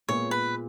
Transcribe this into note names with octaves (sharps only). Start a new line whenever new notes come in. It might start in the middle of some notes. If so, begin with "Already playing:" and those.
A#2 G#3 B3 C#5
B4